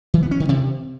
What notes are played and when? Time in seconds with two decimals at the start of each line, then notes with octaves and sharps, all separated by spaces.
0.14 E3
0.22 B3
0.31 C#4
0.40 D#3
0.49 C3